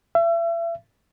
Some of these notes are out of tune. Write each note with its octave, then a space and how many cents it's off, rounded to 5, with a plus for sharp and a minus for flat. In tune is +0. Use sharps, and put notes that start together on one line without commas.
E5 +35